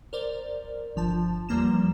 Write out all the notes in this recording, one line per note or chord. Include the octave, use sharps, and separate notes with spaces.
A#4 C5 D5
G1 F3 A5
E2 F3 G3 A#3 A#5 E7